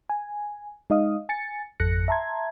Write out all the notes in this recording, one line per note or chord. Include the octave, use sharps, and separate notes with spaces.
G#5
G#3 D#4 D#5 F5 D#6
G#5 A6 C#7
G#1 F2 A4 F#6 A#6 C#7
E5 A5 A#5 C6 G#6